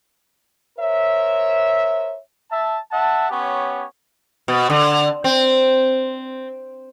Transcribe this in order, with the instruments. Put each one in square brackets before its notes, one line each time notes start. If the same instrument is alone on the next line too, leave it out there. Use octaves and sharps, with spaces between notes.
[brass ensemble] A#4 C5 C#5 E5
[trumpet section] E5 A5
E5 F#5 A5
B3 C#4 G4 C#5
[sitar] B2
D3
C4